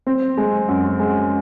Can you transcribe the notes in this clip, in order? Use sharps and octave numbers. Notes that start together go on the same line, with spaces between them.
C4
G#3
F#2
G#3